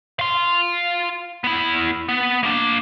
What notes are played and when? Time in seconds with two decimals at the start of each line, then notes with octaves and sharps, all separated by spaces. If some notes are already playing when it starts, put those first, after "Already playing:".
0.19 F5 C6
1.44 B3 E4
2.09 B3
2.43 A#3 D4